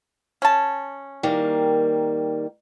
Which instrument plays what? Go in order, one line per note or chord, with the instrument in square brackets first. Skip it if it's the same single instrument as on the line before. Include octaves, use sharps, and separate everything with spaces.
[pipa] C#4 A5
[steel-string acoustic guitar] D#3 G3 A#3